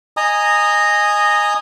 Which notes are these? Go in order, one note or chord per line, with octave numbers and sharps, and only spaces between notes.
D#5 G#5 A#5 D#6